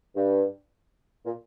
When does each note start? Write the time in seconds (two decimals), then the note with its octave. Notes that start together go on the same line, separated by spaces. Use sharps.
0.15 G2
1.25 A#2